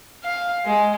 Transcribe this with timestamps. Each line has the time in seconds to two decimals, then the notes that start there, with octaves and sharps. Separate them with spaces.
0.24 F5
0.65 G#3